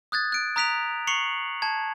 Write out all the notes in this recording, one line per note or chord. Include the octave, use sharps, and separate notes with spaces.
D#6 F#6 G#6 A6
F#6 D7
A#5 D#6 F#6 B6 D7 F7
C#6 C7 C#7 F7 F#7
A5 G#6